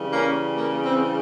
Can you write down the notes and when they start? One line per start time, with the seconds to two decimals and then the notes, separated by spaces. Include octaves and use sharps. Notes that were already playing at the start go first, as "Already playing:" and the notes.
Already playing: C#3 E3 G3
0.13 A#3 C#4
0.55 A#3
0.84 C4